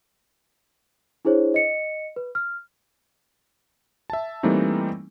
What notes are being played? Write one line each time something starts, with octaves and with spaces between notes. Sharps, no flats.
D4 E4 G#4 C5 C#5
D#5 C#7
B4
F6
E5 A5
E3 G3 A3 A#3 C4 D#4